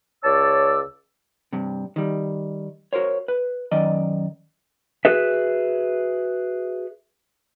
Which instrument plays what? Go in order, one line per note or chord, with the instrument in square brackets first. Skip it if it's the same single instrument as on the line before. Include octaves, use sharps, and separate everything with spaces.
[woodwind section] C#2 C#5 D5 A5 E6
[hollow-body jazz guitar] G2 C3
D#3 G3
F#4 A#4 C5 C#5
B4
F#2 D#3 D5 D#5
[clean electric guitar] F#4 G#4 B4 E5